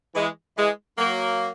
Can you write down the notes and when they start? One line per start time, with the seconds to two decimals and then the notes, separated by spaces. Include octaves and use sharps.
0.15 E3 G#3
0.56 E3 G#3
0.98 F#3 A#3